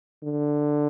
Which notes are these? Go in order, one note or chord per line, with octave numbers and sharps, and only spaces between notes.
D3